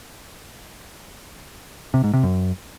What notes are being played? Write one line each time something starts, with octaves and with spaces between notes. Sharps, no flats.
C3
G#2
C3
F#2